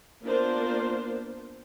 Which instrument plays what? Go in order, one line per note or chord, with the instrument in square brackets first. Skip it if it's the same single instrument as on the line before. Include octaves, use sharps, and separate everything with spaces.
[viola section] A#3 B3 D4 F4 A#4 C5